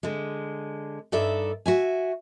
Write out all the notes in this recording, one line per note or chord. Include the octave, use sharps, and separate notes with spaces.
D3 G#3
G2 D#4 A4 D5 E5
F#4 E5 G#5